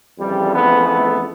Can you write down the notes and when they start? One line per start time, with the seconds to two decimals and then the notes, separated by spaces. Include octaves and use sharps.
0.19 F2 C#3 E3 G3
0.54 A3 B3
0.88 A3 B3